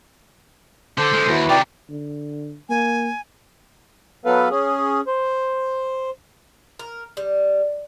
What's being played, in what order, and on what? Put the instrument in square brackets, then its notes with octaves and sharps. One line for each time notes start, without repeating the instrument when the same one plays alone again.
[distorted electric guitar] D3 [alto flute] A4 [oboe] C5
[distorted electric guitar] D3 G#3
[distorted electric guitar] D#2 [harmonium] E4 F#4 B4
[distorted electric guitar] C3 D#3 [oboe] D5 [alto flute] G5
[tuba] D3
[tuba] A#3 [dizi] G#5
[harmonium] F#3 B3 A4 B4 F5
C#4 G#4
C5
[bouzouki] A#4
G3